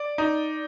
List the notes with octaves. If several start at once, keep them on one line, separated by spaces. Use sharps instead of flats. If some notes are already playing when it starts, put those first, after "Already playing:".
Already playing: D5
D#4